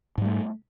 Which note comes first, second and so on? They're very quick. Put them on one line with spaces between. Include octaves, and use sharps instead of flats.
G#2 G3 A3